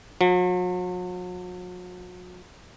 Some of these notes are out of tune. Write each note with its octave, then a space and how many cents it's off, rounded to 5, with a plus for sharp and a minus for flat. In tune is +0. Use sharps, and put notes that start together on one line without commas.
F#3 -45